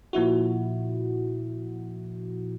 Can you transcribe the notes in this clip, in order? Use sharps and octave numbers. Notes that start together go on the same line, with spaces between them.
A#2 F3 E4 F#4